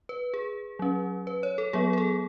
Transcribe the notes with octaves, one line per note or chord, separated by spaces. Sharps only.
B4
G#4
F#3 C#4
B4
C#5
A4
F#3 B3 G#4
G#4
A4